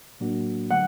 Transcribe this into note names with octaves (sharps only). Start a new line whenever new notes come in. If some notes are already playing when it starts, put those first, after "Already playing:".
A2 F#3 A#3 D4 F#4
D3 F#3 A3 F#5